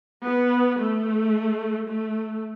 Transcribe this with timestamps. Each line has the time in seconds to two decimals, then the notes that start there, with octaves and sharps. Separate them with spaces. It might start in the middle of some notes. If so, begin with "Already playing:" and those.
0.23 B3
0.79 A3
1.88 A3